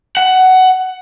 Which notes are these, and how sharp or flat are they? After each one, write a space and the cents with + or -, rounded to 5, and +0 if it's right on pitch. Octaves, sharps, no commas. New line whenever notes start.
F#5 +15